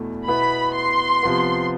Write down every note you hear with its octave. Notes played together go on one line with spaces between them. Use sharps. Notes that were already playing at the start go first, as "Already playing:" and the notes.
Already playing: E2 B2 A3 E4
B2 B3 E4 B5
C6
C3 F3 B3